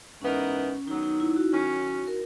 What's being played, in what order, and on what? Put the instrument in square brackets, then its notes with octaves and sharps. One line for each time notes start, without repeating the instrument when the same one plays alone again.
[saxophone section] G#2 E3 B3 D#4 A#4 [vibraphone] C#4
[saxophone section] D#3 F#3 B3 [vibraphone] D#4
[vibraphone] D#4
E4
F#4
[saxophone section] D#3 F#3 C#4
[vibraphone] A#4